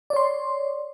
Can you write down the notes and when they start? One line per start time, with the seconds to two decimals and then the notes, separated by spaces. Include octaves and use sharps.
0.10 D5
0.13 C#5
0.16 C6